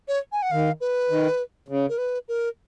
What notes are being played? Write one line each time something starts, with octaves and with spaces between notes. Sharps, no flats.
C#5
G#5
F#5
D#3 F5
B4
D#3
C#3
A#4
B4
A#4